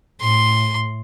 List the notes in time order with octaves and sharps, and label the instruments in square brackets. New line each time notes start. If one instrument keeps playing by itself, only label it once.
[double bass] A2 [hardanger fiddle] C6